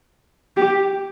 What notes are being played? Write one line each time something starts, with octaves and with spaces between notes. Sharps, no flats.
G4